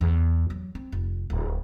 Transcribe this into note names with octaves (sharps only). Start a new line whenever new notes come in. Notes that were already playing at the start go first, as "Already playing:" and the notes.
E2
F#3
C4
F1
D1